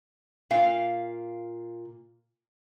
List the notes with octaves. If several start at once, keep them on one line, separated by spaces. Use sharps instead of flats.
A#2 F5